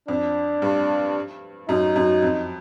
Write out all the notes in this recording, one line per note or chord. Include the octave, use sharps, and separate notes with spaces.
F2 D4
G2
F#2 D#4
F#2
F2